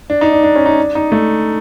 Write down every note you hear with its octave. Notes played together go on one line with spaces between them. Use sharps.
D4
D#4
D4
D4
C#4
D#4
D4
D#4
A3